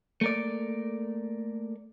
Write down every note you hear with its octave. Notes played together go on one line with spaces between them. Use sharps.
A3 A#3 D5